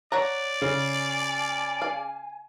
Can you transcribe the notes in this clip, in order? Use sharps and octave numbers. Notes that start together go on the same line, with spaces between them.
C#5 D5 F#5 A#5
C#3 G#5
F5